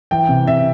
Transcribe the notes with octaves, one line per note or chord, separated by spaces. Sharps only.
E3 G5
C3
C3 E5